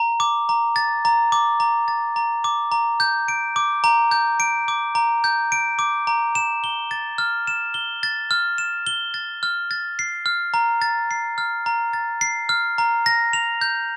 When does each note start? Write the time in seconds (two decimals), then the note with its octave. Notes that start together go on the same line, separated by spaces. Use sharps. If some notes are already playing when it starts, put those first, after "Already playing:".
Already playing: A#5
0.20 D6
0.49 A#5
0.76 A6
1.05 A#5
1.32 D6
1.60 A#5
1.88 A6
2.16 A#5
2.44 D6
2.72 A#5
3.00 G6
3.28 D7
3.56 D6
3.84 A#5
4.11 G6
4.40 D7
4.68 D6
4.95 A#5
5.24 G6
5.52 D7
5.79 D6
6.07 A#5
6.35 E7
6.64 G7
6.91 A6
7.18 F6
7.47 E7
7.74 G7
8.03 A6
8.31 F6
8.58 E7
8.87 G7
9.14 A6
9.43 F6
9.71 A6
9.99 C7
10.26 F6
10.54 A#5
10.82 A6
11.11 C7
11.38 F6
11.66 A#5
11.93 A6
12.21 C7
12.49 F6
12.78 A#5
13.06 A#6
13.33 F7
13.61 G6